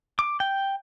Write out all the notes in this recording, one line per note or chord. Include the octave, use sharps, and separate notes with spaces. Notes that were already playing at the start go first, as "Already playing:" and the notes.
D6
G5